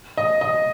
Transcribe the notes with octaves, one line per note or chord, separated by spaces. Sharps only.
D#5
D#5